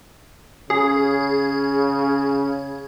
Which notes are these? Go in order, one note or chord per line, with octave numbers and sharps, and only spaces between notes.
C#3 G#4